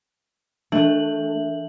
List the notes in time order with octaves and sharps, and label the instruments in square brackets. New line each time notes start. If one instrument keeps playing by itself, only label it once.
[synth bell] E3 D4 F#7 [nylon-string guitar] A3